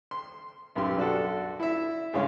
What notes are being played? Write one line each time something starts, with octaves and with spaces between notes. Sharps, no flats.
C6
B1 F#2 G4 C6
D4 F#4 A4
E4 E5
G2 C#3 G#3 C#5 F5